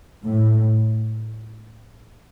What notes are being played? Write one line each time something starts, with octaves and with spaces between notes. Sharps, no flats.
A2